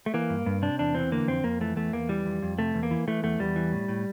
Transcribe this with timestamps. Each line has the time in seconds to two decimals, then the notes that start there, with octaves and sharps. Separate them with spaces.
0.06 A3
0.14 E3 A#3
0.30 G2
0.46 G2
0.62 C3 D4
0.79 E2 D4
0.95 E3 C4
1.12 D3 A#3
1.28 F2 C4
1.44 F2 A#3
1.61 E3 A3
1.76 E2 A3
1.93 E2 A#3
2.09 E3 G3
2.25 F2
2.43 F2
2.59 C3 A3
2.75 E2
2.83 A#3
2.91 E3
3.08 E3 A3
3.23 E2 A3
3.39 E2 G3
3.56 E3
3.72 A2
3.88 A2